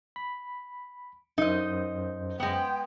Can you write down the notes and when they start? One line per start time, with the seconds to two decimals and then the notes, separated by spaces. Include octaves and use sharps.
0.16 B5
1.38 F#2 D#4 C5 D#5
2.40 G#3 B3 G5